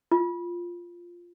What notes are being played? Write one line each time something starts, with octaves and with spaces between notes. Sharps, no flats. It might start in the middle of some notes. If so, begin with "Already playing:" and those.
F4